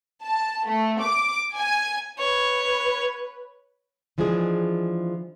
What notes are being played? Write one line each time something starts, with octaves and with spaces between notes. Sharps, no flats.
A5
A3
D6
G#5
B4 C#5
E3 F3 G#3 D4 G#4